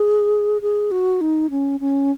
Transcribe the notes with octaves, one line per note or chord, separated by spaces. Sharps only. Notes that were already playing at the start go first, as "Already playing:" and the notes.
Already playing: G#4
G#4
F#4
D#4
C#4
C#4